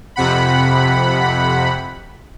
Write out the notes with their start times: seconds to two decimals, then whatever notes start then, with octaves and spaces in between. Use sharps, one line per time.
0.16 F2 C3 F#5 B5